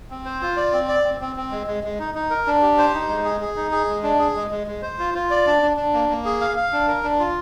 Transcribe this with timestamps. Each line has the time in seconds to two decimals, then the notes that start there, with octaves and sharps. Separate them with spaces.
0.10 C4
0.25 C5
0.42 F4
0.57 D5
0.73 C4
0.88 D5
1.04 C4
1.21 C4
1.36 C4
1.51 G#3
1.67 G#3
1.84 G#3
1.99 D#4
2.15 D#4
2.30 A#4
2.47 D4
2.62 G4
2.78 C5
2.94 D#4
3.09 G#3
3.25 G#4
3.41 G#4
3.56 D#4
3.72 G#4
3.88 G#3
4.03 D4
4.19 G#4
4.36 G#3
4.51 G#3
4.67 G#3
4.82 C5
4.99 F4
5.14 F4
5.30 D5
5.47 D4
5.62 D4
5.77 D4
5.93 A#3
6.09 A#3
6.25 G#4
6.41 F5
6.57 F5
6.73 D4
6.87 A#4
7.03 D4
7.19 F4